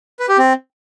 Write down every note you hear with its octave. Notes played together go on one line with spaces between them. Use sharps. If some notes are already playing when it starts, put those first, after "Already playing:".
B4
G4
C4